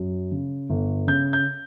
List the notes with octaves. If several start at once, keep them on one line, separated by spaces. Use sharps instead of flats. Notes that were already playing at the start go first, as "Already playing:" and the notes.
Already playing: F#2
C#3
G1
C#3 G6
G6